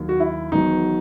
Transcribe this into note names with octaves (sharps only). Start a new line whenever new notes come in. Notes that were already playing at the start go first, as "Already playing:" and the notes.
Already playing: D#2 D#3 F#3
F#4
E4
E1 E2 D#3 F#3 D#4